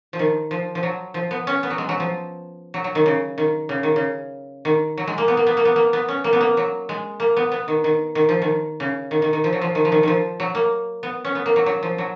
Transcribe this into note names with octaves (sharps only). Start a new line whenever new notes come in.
F3
D#3
F3
F3
F#3
F3
B3
C#4
B3
F#3
G#3
F#3
F3
F#3
F#3
D#3
C#3
D#3
C#3
D#3
C#3
D#3
F#3
G#3
A#3
B3
A#3
B3
A#3
B3
A#3
B3
C#4
A#3
B3
A#3
F#3
G#3
A#3
B3
B3
D#3
D#3
D#3
F3
D#3
C#3
D#3
D#3
D#3
F3
F#3
F3
D#3
F3
D#3
D#3 F3
F#3
A#3
B3
C#4
B3
A#3
F#3
F#3
F3
F#3